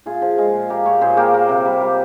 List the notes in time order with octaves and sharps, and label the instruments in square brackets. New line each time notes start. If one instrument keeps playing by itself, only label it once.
[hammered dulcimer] A#2 F4 G#4
F3
G#3 F4 G#4
A#2
A#3 G4 A#4
A#2 A#4 C#5
A#2 G#4 C5
A#3 G4 A#4
A#3
C3
G3
G3